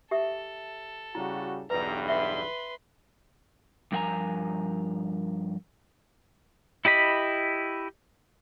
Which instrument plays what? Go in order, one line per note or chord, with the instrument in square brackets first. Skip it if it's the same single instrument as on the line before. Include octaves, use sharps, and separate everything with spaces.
[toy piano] G4 E5 D#6 [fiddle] A4
[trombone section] C#3 G3 F#4 [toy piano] E4
[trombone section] B1 E2 G2 [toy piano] B4 [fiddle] A#5
[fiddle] B4 C6 [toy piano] E5
[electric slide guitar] G2 F3 A#4 F#5 G#5 A#5
[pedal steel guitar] E4 G4 D#5 B5